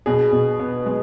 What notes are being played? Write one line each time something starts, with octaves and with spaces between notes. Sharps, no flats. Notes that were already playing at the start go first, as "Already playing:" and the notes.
B2 G#4
B2
B3
G#3